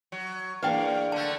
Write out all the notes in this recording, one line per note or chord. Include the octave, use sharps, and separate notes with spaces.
F#3
E2 A#3 D4 B4 F5 G5
D3 A3 A5